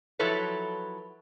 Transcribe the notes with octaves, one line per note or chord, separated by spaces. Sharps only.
F3 F#3 E4 A4 B4 C#5